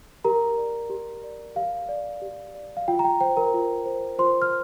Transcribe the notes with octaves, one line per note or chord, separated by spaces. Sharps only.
G4 A#4 A#5
D5
G4
D5
G4 F5
D5
G4
D5
F5
F4 G5
A#5
G5
C5 G5
A#4 A#5
F4
C5
F4 C5 C6
F6